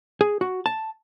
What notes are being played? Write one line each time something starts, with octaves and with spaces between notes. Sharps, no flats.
G#4
F#4
A5